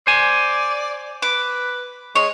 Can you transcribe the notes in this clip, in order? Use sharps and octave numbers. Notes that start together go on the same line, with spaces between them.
C5 D5 G#5
B4 D6
G#3 C#5